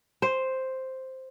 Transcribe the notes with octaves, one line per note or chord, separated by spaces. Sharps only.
C5